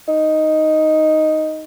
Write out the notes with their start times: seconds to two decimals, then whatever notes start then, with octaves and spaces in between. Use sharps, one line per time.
0.08 D#4